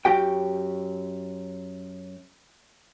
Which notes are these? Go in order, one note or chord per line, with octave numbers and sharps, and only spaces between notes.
F#2 F#4 G4 G5